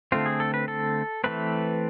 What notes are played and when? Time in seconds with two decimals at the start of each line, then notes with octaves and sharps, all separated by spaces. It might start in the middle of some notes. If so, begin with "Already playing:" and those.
0.12 D3 A3 C4 F4
0.26 G#4
0.40 A4
0.54 B4
0.68 A4
1.24 E3 A3 C4 B4